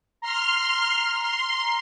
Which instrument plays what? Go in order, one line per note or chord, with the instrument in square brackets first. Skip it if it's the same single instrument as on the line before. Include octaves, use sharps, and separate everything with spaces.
[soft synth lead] A#5 [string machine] C6 F6
[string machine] C6